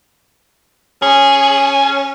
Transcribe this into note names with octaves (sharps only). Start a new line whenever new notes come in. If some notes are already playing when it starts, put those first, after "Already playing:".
C#4 G#4